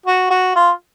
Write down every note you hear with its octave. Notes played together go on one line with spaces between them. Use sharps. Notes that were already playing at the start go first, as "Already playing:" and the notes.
F#4
F#4
F4